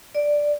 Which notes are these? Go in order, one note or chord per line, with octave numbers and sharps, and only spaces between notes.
D5